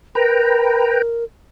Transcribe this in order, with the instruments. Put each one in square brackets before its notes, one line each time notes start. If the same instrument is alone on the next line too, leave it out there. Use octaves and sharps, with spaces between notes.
[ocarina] A#4 [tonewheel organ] B4 G5 A#5